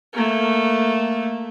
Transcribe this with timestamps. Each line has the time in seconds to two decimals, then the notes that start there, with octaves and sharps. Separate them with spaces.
0.13 A3 A#3